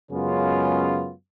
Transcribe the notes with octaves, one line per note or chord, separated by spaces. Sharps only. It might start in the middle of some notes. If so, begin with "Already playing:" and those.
F#2 C#3 G#3 B3 C#4 F4